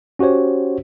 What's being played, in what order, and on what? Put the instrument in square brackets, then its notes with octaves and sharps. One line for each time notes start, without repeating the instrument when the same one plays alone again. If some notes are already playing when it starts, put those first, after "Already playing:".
[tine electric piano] C#4 F#4 G4 C5 C#5